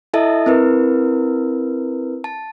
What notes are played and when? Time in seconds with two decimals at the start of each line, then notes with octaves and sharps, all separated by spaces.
0.13 E4 A4 D#5 E5 A5
0.46 C4 E4 A#4 B4
2.24 A5